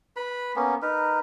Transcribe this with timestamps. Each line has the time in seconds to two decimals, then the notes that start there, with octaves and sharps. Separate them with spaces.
0.16 B4 B5
0.56 A#3 B3 C#4
0.82 D#4 A#4 B4